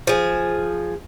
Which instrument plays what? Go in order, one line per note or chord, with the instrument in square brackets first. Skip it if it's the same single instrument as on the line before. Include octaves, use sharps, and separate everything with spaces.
[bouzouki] F3 G#4